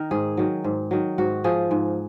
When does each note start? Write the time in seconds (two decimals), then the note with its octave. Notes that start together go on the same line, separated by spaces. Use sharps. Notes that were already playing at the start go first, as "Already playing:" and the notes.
Already playing: D#3 A#4
0.11 G#2 G#4
0.37 D#3 F#3
0.64 G#2
0.91 D#3 F#3
1.18 G#2 F#4
1.44 F3 G#4
1.71 G#2